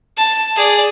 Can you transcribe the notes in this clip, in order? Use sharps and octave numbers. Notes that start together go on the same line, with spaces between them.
A5
G#4 D5